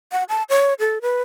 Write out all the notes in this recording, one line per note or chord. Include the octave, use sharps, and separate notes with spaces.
F#5
A5
C#5
A4
B4